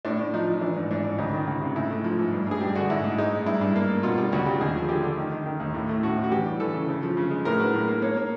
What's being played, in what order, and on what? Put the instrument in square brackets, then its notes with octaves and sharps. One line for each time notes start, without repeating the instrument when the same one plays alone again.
[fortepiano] A2 D4
A2
F3 D#4
F3
E3 D4
G#2
G#2 D4
G#2
C#2 D#4
D#3
C#2
C3
G#2 E4
A3
F3
G#2
G2
G2 G#4
G2 G4
D3 F#4
G#2 E4
G#2
G#3 D#4
G#2
G2 E4
G2
A#3
A#3
B2 F4
G3
C#2 F#4
G3 G4
D#2 G#4
F3
D3 G4
D3
D#3
D#3
D#3
D#2
A2
A3
A2 F#4
A2
F#4
E3 G4
G3
E3 A4
C#3
C#3
F3
C#3
G#3
A2 A#4
F#3 B4
A2
A#3
A#3 C#5
A#3